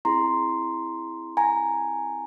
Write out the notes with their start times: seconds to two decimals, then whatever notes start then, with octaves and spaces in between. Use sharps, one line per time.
0.05 C4 E4 G#4 A#5 C6
1.37 G#5 A#5